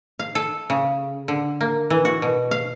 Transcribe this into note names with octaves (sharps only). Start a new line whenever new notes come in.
F5
A4
C#3
D3
A#3
E3
F#4
B2
F5